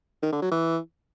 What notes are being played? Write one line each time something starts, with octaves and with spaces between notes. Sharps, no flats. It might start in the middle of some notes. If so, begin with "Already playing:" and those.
D#3
D3
F#3
E3